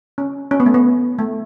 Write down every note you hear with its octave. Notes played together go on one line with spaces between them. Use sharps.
C#4
C#4
B3
A3
B3
A3